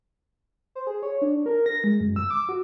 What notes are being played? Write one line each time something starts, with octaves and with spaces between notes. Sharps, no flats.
C5
G#4
C#5
D4
A#4
A#6
G#3
F#2
E6
D6
F#4